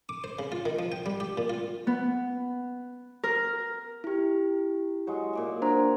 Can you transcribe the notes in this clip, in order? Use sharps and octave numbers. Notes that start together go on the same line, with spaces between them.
D6
C5
C#3
F4
D#3
F3
G5
G3
G4
A#2
F4
B3
A#4
E4 G4
F#3 G#3
A#2 D5 E5
D4 C5 A#5